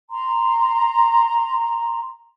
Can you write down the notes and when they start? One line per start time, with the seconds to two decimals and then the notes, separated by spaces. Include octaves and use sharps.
0.10 A#5 C6